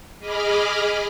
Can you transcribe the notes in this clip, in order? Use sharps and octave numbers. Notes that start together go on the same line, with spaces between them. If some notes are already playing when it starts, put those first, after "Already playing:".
G#4 D#5 B5 D6 F6